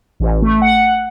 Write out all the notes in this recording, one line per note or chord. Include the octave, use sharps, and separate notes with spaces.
A1
A3
F#5